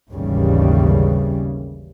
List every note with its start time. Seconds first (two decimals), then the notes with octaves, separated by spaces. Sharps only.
0.11 G#1 D#2 C#3 E3 G3